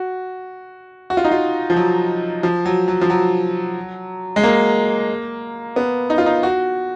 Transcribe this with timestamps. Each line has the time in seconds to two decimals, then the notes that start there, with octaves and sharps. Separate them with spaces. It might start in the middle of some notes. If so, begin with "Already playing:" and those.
Already playing: F#4
1.10 F#4
1.17 F4
1.25 D#4
1.32 F4
1.70 F3
1.76 F#3
2.43 F3
2.65 F#3
2.88 F#3
3.01 F3
3.10 F#3
4.36 G#3
4.43 A#3
5.76 B3
6.10 D#4
6.18 F4
6.26 D#4
6.43 F#4